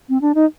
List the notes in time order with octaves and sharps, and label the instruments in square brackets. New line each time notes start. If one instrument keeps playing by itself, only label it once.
[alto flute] C4
D4
D#4